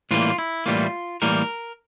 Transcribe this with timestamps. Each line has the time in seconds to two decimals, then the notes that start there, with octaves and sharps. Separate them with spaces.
0.11 A2 E3 G3 A#3 F4
0.38 E4
0.66 A2 E3 G3 A#3 F4
1.22 A2 E3 G3 A#3 A#4